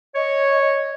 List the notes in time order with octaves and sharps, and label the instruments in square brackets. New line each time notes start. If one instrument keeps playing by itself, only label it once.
[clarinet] C#5 [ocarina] D#5